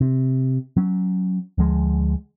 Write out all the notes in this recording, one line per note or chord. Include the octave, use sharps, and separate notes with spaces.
C3
F#3 C#4
D2 F3 G#3